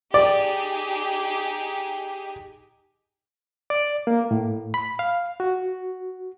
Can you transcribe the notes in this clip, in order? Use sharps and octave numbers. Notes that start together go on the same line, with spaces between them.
D#4 G4 G#4 D5
D5
A#3
A2
B5
F5
F#4